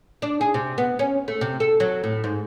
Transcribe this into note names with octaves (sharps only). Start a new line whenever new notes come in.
D4
G#4
C3
B3
C#4
A3
C3
A4
F#3
A2
G#2